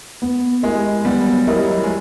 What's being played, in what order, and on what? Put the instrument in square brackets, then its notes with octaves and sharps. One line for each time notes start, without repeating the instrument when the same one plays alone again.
[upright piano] B3
[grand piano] G#3 [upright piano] E4 G4 A#4 D#5
[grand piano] G3 [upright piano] B3
[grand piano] F#3
[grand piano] F#3 [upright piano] E4 G4 A#4 D#5
[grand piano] F#3
G#3